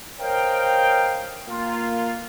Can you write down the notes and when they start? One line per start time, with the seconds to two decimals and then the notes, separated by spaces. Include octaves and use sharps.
0.21 A#4 C5 C#5 D#5 F5 G5
1.49 A#3 F4